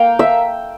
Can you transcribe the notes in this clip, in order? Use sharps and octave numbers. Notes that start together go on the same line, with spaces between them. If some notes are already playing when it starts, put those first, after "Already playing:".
Already playing: A#3 F5 G5
E5